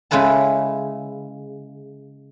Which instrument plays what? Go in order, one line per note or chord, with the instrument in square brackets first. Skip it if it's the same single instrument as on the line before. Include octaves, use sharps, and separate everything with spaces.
[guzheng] C#3 G#3 E4 B4 A5